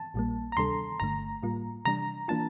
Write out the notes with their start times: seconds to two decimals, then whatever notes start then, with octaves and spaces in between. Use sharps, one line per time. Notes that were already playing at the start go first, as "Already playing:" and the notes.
Already playing: A5
0.14 A#1 A#2 G3 A#3
0.52 A#5
0.57 D2 C3 G3 D4 A4 C6
1.00 G1 G2 D3 A3 A#5
1.43 A2 G3 A#3 F4
1.85 C3 E3 G3 D4 A#5
2.28 E3 A#3 D4 F4 A5